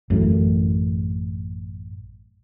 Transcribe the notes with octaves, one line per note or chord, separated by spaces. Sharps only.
A1 F#2 A2